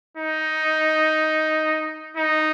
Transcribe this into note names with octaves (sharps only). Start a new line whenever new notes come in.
D#4
D#4